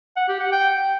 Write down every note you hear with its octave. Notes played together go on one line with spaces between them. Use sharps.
F#5
G4
F#5
G5